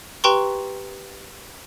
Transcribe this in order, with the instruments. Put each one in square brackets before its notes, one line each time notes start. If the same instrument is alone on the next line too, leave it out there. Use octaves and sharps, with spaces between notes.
[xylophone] G4 B4 G5 A#5 C6 C#6